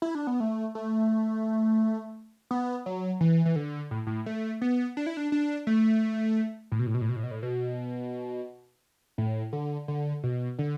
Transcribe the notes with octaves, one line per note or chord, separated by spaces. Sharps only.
E4
D4
B3
A3
A3
B3
F#3
E3
E3
D3
A2
A2
A3
B3
D4
E4
D4
D4
A3
A2
B2
A2
B2
A2
B2
A2
B2
A2
B2
A2
D3
D3
B2
D3